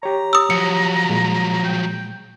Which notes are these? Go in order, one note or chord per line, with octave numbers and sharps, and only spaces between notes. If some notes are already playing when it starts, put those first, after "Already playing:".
G4 C#5 A#5
D#6 E6
F3 F#3 C#7
A#2 G#3
G5